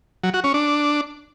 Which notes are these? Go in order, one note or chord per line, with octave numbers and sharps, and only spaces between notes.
F#3
F#4
C#4
D4